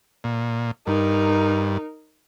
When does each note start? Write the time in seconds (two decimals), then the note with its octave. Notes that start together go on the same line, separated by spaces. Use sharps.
0.24 A#2
0.87 G2 D#4 A#4